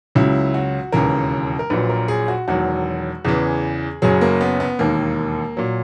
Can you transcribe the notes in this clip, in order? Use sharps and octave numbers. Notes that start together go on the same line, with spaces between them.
C#2 C#3 F#3 E4
F#4
E1 D#2 C#3 E3 A#4
A#4
A#1 A#2 F#3 B4
A#4
G#4
F#4
E1 E2 D#3 F#3 F#4
E2 C#3 E3 G#4
F#1 F#2 C#3 F#3 G#4
A#3
B3
B3
E1 D#2 D#3 A#3
A#2 F#3